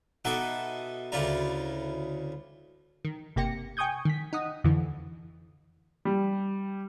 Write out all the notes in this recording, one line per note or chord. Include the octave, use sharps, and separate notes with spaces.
B2 D#4 A4 E5 F#5 D6
D2 C#3 E4 F4 D5 A#5
D#3
G1 C3 A#3 G4 A#6 C#7
G5 G#5 C#6 D#6 G6 G#6
D#3 B6
D#4 F#5 D#6
F2 D3 E3
G3